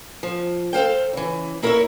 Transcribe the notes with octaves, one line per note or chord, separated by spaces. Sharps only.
F3
A4 C5 F5 G5
C#3 E3
A#3 E4 A#4 C5 C#5 E5